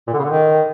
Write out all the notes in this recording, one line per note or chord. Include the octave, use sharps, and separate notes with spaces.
A#2
D3
C#3
D3
D#3